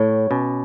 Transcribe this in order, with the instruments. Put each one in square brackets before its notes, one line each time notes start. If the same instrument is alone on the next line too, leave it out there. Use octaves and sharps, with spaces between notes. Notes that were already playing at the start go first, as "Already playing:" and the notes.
Already playing: [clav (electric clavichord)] A2 [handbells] C#5
[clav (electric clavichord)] B2 [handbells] C#4